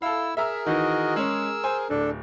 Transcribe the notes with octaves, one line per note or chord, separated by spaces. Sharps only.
E4 A4 F5 E6
G#4 A#4 E5 A#5 E6
D#3 E3 F#4 D#5
G#3 C#4 E6
C5 G#5
D1 D4 A4